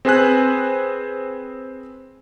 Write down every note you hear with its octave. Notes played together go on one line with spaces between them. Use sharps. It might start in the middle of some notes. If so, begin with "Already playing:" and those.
C4 G#4 B4 C5 G#5 F#6